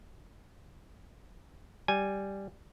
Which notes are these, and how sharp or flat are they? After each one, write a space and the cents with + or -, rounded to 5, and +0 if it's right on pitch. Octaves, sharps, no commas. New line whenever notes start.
G3 +0 G#5 -5